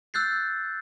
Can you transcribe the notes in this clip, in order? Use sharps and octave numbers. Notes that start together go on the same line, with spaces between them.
E6 F#6 G6 A6 C7